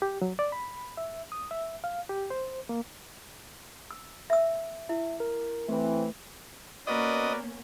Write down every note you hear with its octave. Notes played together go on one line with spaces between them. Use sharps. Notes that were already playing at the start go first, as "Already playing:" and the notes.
G4
F#3
D5
B5
E5
D#6
E5
F5
G4
C5
A#3
E6
E5 E6
E4 E5
A#4
E3 A3 C4
A#3 B3 C#4 F#4 A#4 B4 D5 D#5